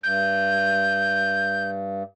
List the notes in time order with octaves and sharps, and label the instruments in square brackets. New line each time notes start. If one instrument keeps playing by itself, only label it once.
[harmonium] G2 [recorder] G6